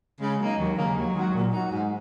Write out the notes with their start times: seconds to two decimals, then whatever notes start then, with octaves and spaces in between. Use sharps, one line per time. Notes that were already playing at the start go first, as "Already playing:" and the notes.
0.20 C#3 G#3
0.39 F#3 A#3 D#4
0.58 D#2 F#3
0.77 C#3 A#3
0.96 D#2 F#3
1.15 D#3 G#3 F#4
1.34 A#2
1.53 F#3 D#4 F#4
1.71 G#2